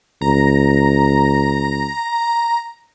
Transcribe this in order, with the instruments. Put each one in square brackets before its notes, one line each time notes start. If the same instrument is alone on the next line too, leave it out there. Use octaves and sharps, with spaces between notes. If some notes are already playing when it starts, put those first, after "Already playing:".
[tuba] C#2 [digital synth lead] A#5